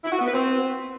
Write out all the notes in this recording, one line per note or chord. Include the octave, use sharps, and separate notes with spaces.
E4
F#4
B3
B4
C4